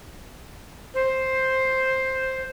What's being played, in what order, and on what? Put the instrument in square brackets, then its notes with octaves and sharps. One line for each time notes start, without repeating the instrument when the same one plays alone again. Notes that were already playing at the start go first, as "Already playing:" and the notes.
[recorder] C5